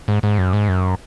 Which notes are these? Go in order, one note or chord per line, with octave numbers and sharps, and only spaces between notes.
G#2
G#2
F#2
G#2
F#2